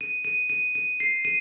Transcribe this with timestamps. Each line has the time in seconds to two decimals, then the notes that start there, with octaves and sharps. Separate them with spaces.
0.01 D#7
0.25 D#7
0.50 D#7
0.75 D#7
1.00 C7
1.25 D#7